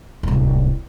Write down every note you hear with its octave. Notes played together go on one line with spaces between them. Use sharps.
D1 C2